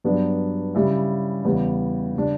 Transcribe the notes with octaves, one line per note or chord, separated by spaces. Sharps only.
G2 F#3 B3 D4
C#3 G3 C#4 E4
E2 C#3 G3
C#3 G3 D4